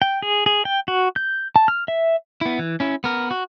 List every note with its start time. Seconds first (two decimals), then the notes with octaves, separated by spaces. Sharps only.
0.02 G5
0.22 G#4
0.46 G#4
0.65 G5
0.88 F#4
1.16 G6
1.56 A5
1.68 F6
1.88 E5
2.41 B3 E4
2.59 E3
2.80 C#4 E4
3.04 B3 A#4
3.31 F#4